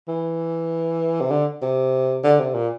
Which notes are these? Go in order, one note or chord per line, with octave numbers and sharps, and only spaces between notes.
E3
C3
D3
C3
D3
C3
A#2